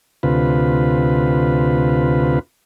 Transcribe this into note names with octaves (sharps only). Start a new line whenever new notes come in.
D2 C3 F4 B4